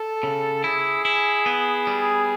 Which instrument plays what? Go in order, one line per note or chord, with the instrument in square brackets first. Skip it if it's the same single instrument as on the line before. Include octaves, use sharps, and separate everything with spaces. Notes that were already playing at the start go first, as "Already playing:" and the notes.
Already playing: [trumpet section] A4
[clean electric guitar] C#3
[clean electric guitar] E4 [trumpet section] G#4
[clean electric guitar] E4
B3
G3